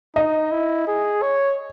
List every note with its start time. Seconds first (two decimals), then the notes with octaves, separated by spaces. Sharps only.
0.16 D#4 D#5
0.51 E4
0.87 G#4
1.22 C#5